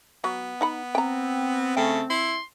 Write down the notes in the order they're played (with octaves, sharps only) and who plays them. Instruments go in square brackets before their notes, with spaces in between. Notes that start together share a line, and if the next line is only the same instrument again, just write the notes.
[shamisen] F#3 [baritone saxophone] B3
[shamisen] D#4 F#5 B5
[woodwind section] C4 [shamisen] G5 A#5
[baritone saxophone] C#3 [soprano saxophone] A3 [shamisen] G5
[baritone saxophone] E4 [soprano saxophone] C6